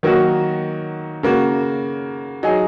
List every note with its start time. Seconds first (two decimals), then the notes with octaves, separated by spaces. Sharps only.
0.03 D#3 F#3 A#3 D#4 F#4
1.23 C#3 A#3 F#4
2.43 F#3 D#4 G#4